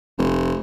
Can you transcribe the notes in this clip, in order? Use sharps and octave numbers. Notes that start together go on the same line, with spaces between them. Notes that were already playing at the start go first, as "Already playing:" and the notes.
F1